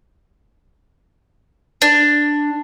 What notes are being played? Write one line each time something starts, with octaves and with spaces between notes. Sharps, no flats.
D4